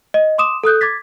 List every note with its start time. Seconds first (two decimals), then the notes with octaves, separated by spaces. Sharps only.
0.14 D#5
0.38 C6 D6 D#6 E7
0.64 A4 D#6 F#6 G6
0.81 D6 G#6 A6 B6